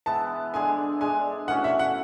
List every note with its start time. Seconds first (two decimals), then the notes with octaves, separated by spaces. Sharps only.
0.06 E3 G#3 B3 E4 A5
0.54 D3 G#3 D4 G#4 G#5
1.01 G#3 D4 G#4 G#5
1.48 E3 A3 C#4 F#4 F#5
1.64 E5
1.79 F#5